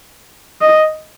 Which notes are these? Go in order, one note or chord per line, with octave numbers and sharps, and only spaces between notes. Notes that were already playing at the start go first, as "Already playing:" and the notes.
D#5